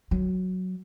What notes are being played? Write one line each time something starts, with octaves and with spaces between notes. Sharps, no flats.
F#3